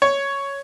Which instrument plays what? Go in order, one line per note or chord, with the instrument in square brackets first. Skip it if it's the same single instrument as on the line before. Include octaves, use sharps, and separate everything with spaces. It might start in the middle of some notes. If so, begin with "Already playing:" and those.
[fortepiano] C#5